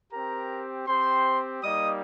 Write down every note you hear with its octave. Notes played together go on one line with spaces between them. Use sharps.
C4 G4 A#4 A#5
C4 G4 C5 C6
G3 A#3 D#4 D#5 D#6